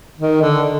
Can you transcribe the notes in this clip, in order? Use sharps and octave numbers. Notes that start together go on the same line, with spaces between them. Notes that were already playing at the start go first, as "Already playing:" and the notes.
D#3
D3